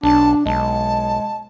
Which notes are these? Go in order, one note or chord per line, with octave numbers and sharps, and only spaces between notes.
B1 D4 A5
B1 G#3 A5